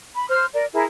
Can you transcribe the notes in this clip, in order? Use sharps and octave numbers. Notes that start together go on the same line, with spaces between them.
B5
C5 F6
A#4 D5
E4 G#4 A#4